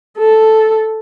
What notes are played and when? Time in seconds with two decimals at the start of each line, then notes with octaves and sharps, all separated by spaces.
0.19 A4